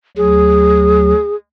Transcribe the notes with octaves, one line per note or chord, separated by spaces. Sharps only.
D2 F#3 G#4